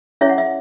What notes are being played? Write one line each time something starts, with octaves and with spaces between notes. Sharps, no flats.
C#4 E4 G#4 C#5 E5
F#5
E5